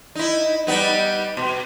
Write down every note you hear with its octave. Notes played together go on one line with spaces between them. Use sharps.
D#4 E4
G3 B3 D#4
B2